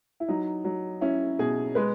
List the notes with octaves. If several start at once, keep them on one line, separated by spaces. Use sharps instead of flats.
E4
F#3 D#4
F#3
C#4 E4
B2 G#4
G#3 B4